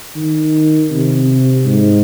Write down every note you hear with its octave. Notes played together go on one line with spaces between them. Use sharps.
D#3
C3
G#2